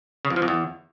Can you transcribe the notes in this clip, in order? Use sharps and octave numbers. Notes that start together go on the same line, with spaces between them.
C#3
F2
F3
F2
E2